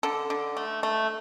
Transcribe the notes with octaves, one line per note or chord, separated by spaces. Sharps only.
D3 A4
D3
A3
A3